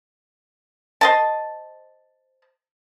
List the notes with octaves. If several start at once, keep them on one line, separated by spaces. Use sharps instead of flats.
C5 D#5 A5